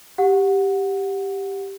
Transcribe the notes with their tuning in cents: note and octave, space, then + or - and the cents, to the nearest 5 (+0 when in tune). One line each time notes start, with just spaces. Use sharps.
G4 +0 F#5 -15